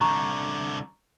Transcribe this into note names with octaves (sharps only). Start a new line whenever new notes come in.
C2 D3 A#5 C#6